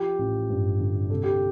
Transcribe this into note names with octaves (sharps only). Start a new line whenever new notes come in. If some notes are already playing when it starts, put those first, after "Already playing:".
Already playing: F3 G4
A1
G2
D3
C2 A4
G4